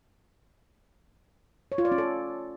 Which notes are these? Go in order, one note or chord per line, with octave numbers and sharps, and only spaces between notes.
C#5
F4
D5
C#4
A4